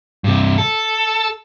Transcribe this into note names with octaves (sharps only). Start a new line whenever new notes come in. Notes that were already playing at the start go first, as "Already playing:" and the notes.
G2 C3
A4